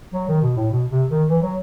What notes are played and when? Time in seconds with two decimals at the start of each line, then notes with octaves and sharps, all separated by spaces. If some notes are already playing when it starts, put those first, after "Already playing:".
0.14 F#3
0.29 D#3
0.42 B2
0.56 A2
0.71 B2
0.90 C3
1.10 D#3
1.28 E3
1.42 F#3